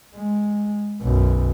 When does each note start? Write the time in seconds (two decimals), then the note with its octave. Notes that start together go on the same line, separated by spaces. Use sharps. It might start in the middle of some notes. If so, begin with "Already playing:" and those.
0.15 G#3
1.02 B1 F#2